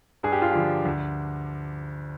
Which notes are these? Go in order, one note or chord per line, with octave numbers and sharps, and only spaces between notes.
G2 G#4
G4
F4
D3 F3 G4
D2